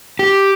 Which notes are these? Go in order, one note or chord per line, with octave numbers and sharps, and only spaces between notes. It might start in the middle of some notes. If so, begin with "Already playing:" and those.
G4